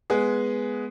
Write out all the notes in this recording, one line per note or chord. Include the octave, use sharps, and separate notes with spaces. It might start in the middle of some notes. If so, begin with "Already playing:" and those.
G#3 B3 G#4